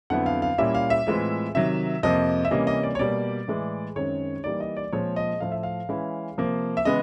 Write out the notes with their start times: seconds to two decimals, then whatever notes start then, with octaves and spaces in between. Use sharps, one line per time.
0.10 F2 D3 F#3 B3 E4 F#5
0.26 F5
0.42 F5
0.58 A#2 G3 A#3 C#4 E4 E5
0.75 F5
0.90 E5
1.07 A2 E3 G#3 C4 F4
1.55 C3 D#3 F#3 E5
2.03 F2 C3 F3 A#3 D#5
2.45 E5
2.51 C3 E3 G3 A#3 C#4 D#5
2.67 D#5
2.83 D5
2.95 C#5
2.99 B2 G3 A#3 D5
3.48 A2 E3 G#3
3.96 F#2 D#3 G#3 C4 C#5
4.44 E3 G3 A#3 D#4 D5
4.60 D#5
4.77 D5
4.92 A#2 F3 G#3 C4 C#5
5.16 D#5
5.40 A2 F3 A3 F5
5.52 E5
5.63 F5
5.89 E3 G#3 C#4 E4
6.37 C3 F3 A#3
6.77 E5
6.85 C#3 E3 G#3 B3 D#5